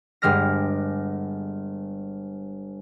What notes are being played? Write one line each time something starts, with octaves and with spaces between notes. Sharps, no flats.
G1 G2 G3 G#3 F6 A#6